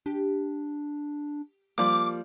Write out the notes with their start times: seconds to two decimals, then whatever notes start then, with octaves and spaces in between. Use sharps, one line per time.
0.06 D4 G4
1.78 F3 G3 A#3 D6